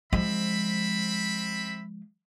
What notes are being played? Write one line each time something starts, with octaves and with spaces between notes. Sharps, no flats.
F3 G#3 C4 E5 B5